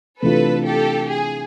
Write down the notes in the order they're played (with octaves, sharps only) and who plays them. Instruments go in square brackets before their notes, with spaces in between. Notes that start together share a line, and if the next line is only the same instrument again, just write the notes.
[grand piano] C3 E3 A3 D4 F4 [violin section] A4 B4
[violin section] G4 A4
G#4